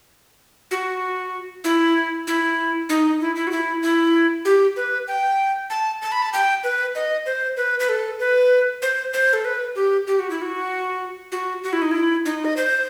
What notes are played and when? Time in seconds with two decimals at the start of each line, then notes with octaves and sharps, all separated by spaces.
0.71 F#4
1.64 E4
2.27 E4
2.89 D#4
3.21 E4
3.36 E4
3.47 F#4
3.51 E4
3.83 E4
4.45 G4
4.76 B4
5.08 G5
5.70 A5
6.02 A5
6.12 B5
6.22 A5
6.33 G5
6.64 B4
6.95 D#5
7.26 C5
7.57 B4
7.80 B4
7.89 A4
8.20 B4
8.82 C5
9.13 C5
9.33 A4
9.45 B4
9.75 G4
10.07 G4
10.19 F#4
10.30 E4
10.42 F#4
11.32 F#4
11.63 F#4
11.73 E4
11.82 D#4
11.91 E4
12.26 D#4
12.45 D#5
12.57 C5